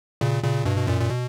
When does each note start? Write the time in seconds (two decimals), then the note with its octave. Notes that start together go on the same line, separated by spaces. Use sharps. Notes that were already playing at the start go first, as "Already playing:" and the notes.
0.21 A#2 C#3
0.43 A#2 C#3
0.65 G2 B2
0.77 B2
0.87 F#2 A#2
1.01 A#2
1.10 B2